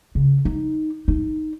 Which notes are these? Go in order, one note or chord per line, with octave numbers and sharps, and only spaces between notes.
C#3
D#4
D#4